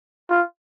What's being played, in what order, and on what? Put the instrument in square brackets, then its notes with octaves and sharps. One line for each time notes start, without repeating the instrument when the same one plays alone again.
[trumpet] F4